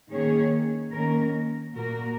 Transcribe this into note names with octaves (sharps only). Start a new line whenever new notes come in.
D#3 A#3 C#4 G#4 C#5
D#3 A#3 C#4 A#4
A#2 A#3 F#4 A#4